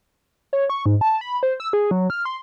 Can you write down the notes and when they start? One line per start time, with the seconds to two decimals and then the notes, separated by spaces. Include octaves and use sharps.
0.53 C#5
0.70 C#6
0.86 G#2
1.01 A5
1.21 B5
1.43 C5
1.60 E6
1.73 G#4
1.91 F#3
2.10 F6
2.25 C6